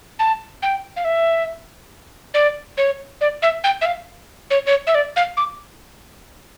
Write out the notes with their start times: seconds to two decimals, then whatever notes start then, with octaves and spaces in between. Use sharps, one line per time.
0.19 A5
0.63 G5
0.97 F5
1.05 E5
2.34 D5
2.77 C#5
3.21 D5
3.42 E5
3.64 G5
3.81 E5
3.86 F5
4.51 C#5
4.66 C#5
4.87 E5
4.95 D5
5.16 F5
5.37 D6